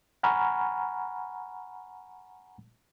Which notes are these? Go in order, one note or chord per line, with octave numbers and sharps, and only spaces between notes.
F#5 G#5 A#5 B5 C#6 F6